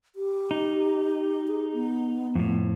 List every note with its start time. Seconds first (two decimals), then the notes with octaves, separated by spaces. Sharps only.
0.16 G4
0.51 D#4
1.48 G#4
1.73 B3
2.35 F2 A2